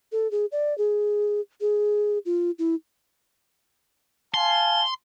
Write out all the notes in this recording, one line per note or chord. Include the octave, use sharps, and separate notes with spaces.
A4
G#4
D5
G#4
G#4
F4
E4
F5 G#5 A5 C6